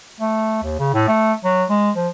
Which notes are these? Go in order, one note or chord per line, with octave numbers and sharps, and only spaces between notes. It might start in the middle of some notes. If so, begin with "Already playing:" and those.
A3
D#2
C#3
A2
A3
F#3
G#3
F3